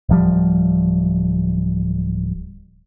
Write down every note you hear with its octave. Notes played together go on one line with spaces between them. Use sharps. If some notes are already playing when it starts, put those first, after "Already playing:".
D1 F3 G3